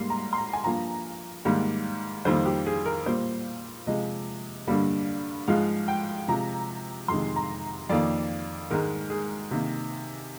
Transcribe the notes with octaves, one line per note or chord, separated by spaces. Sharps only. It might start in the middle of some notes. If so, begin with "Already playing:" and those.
Already playing: G#2 G3 A#3 C6
A#5
C6
A#5
G#5
G2 F3 A#3 A#5
G#2 D#3 G3 A#3
F2 D#3 G3 A#3 C5
G4
G#4
A#4
A#2 G3 A#3 C5
C3 F3 G#3 D#5
G2 D3 G3 A#3
G#2 F3 G#3 F5
G5
C3 F3 G#3 A#5
F2 C3 D#3 G#3 C6
A#5
F2 D#3 A#3 D5
G#2 D#3 G#3 A#4
G#4
C3 D#3 A#3